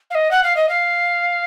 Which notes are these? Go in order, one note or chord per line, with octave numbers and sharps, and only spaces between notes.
F5
D#5
F#5
F5
D#5
F5